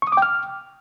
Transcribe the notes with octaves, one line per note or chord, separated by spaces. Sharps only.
C#6
D#6
D6
G5
F6